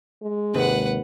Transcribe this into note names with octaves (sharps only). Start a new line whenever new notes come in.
G#3
D#2 G#2 C3 B4 F#5